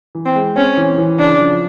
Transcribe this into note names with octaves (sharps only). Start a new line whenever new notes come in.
E3
C4
G#3
C4 C#4
E3
E3
C#3 D4
F3